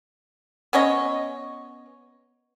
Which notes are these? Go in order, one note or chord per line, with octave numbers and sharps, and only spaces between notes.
B3 C#4 C#5 D#5